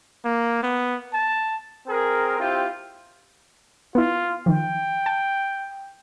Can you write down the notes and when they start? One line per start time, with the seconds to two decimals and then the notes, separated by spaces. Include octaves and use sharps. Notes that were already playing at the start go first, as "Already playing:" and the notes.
0.25 A#3
0.63 B3
1.14 A5
1.87 C4 G#4 A#4
2.39 C4 E4 F4 G4
3.95 B3 E4 F4
4.46 D#3 F3 G5
5.06 A5